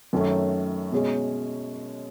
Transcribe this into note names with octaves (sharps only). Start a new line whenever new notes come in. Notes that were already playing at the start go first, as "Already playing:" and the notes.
F#2 D#3 A3 C#4
B2 G#3 C#4 G#4